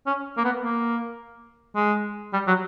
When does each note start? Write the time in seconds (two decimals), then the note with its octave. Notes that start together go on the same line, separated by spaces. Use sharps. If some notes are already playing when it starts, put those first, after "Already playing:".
0.07 C#4
0.38 A#3
0.45 B3
0.63 A#3
1.76 G#3
2.33 G3
2.47 F#3